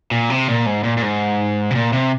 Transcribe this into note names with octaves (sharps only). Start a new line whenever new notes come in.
A#2
C3
A#2
G#2
A#2
A#2
G#2
C3
A#2
C3